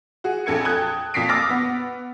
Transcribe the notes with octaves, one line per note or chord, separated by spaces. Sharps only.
F#4 G#4
A#1 F2 A4 G#6 C#7
G5 A5 D#6 F#6 G#6
F2 A#2 D#6 B6 C7 D7
D6 E6 F6 A6 A#6
B3